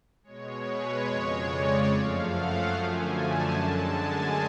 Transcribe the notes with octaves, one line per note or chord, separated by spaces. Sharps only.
B2 G#3 C#5
B4
F2 C#3 G#3 C#5
D5
F#2 F3 A3 F5
F#5
F#2 D3 F3 A3 G#5
A5
F#2 D3 G#3 A5
G#5